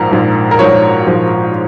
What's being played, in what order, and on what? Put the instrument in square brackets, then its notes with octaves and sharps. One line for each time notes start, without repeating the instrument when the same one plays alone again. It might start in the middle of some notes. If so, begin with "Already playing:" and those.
Already playing: [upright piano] A#1 G#2 F3 A#4
A#1 G#2 F3
A#4
A#1 G#2 F3 C#5
A#1 G#2 F3